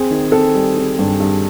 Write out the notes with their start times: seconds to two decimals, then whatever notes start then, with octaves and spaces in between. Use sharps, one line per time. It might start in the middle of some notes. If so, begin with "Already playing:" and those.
Already playing: C4 G#4
0.11 D#3
0.32 C4 A4
0.55 G3
0.77 C4
0.99 G2
1.20 G2